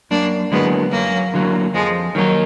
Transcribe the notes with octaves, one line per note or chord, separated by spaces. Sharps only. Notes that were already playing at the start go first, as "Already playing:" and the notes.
F#2 A#3 D4
D3 F#3 G#3 A#3 B3
F#2 F#3 A#3
D3 F#3 A#3
F2 F3 G#3
D#3 F#3 A#3 D#4